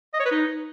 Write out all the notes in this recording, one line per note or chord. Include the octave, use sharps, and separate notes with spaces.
D#5
C#5
B4
D#4